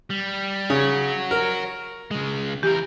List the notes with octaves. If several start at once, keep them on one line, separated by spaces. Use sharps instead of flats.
G3
C#3 F#4 C#5
A#4
C#3 G#3
E2 G4 A#4